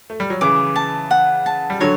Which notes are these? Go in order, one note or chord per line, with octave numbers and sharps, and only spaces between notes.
A3
G3
F#3
C#3 E3 D6
A5
F#5
A5
G3
D3 F#3 C#5